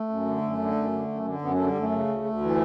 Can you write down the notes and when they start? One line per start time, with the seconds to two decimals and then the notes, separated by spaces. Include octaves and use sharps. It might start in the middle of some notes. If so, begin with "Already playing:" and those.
Already playing: A3
0.09 F#2
0.25 D3
0.42 F#2
0.58 D3
0.75 F#2
0.91 D3
1.08 F#2
1.24 D3
1.41 F#2 B3
1.54 D3 A3
1.66 G3
1.75 F#2 A3
1.92 C#3
2.07 D2
2.24 D2
2.41 E3